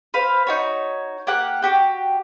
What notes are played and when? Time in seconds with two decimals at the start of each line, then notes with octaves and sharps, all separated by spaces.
0.14 B4 C5 F5
0.47 D#4 F#4 C#5
1.27 A#3 G4 F#5 F#6
1.62 F#4 G4 G5